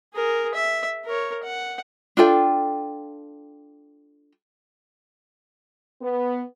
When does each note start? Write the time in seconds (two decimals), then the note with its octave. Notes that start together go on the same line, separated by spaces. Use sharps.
0.14 G#4 A#4
0.54 E5
1.05 A#4 C#5
1.43 F#5
2.17 D4 F4 A4 G5
6.01 B3